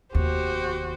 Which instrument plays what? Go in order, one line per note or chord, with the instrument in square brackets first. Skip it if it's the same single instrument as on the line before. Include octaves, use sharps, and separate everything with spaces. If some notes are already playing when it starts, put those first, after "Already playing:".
[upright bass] F1 D#2 [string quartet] F#4 G4 C5